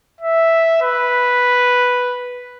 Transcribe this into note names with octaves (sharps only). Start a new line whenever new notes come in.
E5
B4